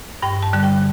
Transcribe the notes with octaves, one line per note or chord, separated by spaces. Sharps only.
G2 G5
A5
D3 G3
G5